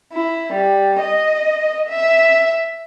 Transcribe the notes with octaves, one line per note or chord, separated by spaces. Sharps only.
E4
G3
D#5
E5